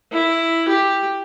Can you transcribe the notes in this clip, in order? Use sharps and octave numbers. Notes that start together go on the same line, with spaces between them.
E4
G4